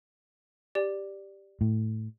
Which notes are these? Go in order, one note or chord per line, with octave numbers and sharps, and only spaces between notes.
G4 D5
A2